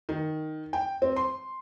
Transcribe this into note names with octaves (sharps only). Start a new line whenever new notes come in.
D#3
G5
C4
C6